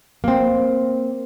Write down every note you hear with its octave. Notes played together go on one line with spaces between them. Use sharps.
A#3 C4